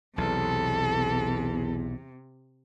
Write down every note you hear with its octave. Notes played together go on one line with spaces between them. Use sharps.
B1 E2 C3 A4